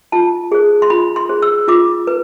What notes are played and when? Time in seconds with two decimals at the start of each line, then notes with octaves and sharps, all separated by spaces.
0.12 F4 A5
0.52 G#4 C5
0.82 C6
0.90 F4 B5
1.16 C6
1.29 G#4 C5
1.42 E6
1.68 F4 D6
2.07 B4